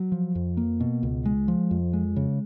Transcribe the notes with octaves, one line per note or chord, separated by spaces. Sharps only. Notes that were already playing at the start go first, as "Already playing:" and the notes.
Already playing: F#3
F3
F2
A#3
B2
C#2
G#3
F3
F2
G#3
C#3